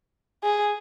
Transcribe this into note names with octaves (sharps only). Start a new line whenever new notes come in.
G#4